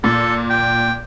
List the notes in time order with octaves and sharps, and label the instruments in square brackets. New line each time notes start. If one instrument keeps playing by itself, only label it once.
[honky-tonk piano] A#2 [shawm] A4
[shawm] G5